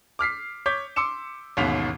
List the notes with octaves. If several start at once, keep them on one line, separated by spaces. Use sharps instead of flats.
D6 F6 B6 C7
C#5 D6 G6 B6
C6 D6 E6 C#7 E7
A1 D#2 G#2 B2 B6 F7